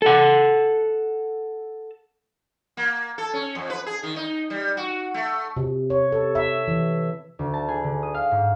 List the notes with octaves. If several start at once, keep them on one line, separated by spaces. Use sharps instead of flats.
A4 F#5
A#3
A4
C#4
F2
B4
G#4
D#3
D#4
G3
F#4
A3
C3
C#5
A4
E5
E3
D2
A5
G#4
D3
D#6
F5
G#2